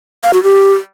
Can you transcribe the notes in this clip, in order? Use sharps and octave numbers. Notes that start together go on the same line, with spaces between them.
F5
F#4
G4